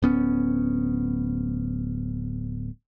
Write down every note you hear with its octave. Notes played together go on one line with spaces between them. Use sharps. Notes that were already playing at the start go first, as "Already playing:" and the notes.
D1 B3 C#4